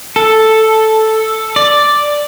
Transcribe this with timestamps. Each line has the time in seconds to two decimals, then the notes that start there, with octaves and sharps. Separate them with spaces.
0.16 A4
1.56 D5